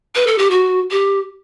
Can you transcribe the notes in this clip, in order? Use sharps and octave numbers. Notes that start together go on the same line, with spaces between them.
B4
A4
G4
F#4
G4